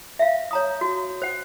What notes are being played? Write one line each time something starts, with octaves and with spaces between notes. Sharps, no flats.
E5 F5
C#5 A#5 D#6
F#4
C5 F#5